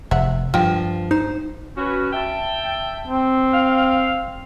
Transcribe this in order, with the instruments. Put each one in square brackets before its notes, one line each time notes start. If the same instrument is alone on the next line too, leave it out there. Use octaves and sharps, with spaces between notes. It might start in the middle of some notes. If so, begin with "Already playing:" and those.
[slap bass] F1 [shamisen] E5 F#5
[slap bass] G2 [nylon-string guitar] F3 [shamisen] F4 G5
[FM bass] D#4 [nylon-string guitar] C5
[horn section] C#4 F#4 B4
E5 G5 A5
[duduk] C4
[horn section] F5